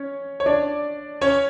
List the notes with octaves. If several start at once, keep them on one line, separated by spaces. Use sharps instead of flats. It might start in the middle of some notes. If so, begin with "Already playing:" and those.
Already playing: C#4 C#5
C#5
D4 D5
C#4 C#5